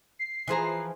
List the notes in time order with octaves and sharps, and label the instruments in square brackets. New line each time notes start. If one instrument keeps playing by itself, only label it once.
[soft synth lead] C7
[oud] E3 F3 G#4 [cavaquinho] B4 C5 A#5